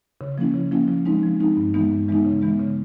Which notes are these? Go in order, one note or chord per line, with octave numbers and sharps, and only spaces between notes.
C#3
F3 A#3 C#4 E4
C#3
F3 A#3 C#4 E4
F3
G#3 C4 D#4
F3
G#3 C4 D#4
G2
E3 G#3 B3 D#4
G2
E3 G#3 B3 D#4
C#3
E3 G#3 B3
C#3